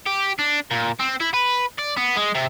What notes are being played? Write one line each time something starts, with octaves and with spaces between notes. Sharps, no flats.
G4
D4
A#2
C4
E4
B4
D5
B3
G#3
C3